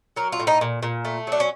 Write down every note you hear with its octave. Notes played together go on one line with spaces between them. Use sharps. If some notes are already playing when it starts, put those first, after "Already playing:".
F#3 A#4
F4
A2
D#4
A#2
A#2
A3
F#3 D4
C#4